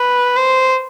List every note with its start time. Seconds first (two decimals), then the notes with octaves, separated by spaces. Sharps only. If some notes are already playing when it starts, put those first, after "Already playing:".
Already playing: B4
0.37 C5